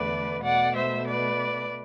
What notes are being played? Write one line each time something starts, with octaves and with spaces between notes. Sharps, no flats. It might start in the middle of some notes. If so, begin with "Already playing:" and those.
Already playing: E2 D3 A3 B4 D5
B2 A3 D5 F#5
C5 E5
B4 D5